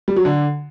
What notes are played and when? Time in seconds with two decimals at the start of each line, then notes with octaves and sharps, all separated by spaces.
0.08 G3
0.16 F#3
0.25 D3